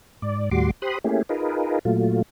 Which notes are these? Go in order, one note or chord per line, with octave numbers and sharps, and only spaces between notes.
G#2 D5
D#2 A2 G3 F#4 C6 D6
G4 C5 B5 C6 D#6 F#6
A3 A#3 C#4 E4 G4 G#4
D#4 F4 G#4 A#4 B4
A#2 F#3 A3 F4